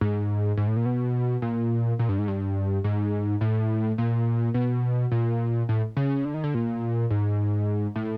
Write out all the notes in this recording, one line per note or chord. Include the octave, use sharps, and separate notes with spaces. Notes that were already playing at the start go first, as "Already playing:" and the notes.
G#2
G#2
A2
A#2
B2
A#2
A#2
G2
G#2
G2
G#2
A2
A#2
B2
A#2
A2
C#3
D3
D#3
D3
A#2
G#2
A2